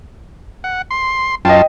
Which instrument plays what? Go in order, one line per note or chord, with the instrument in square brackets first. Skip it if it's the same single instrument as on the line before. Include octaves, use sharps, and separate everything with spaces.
[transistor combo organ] F#5
C6
[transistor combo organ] F#2 F4 A5 [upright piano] D#5 G5